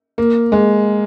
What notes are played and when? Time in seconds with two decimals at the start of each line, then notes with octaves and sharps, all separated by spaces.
0.18 A#3
0.52 G#3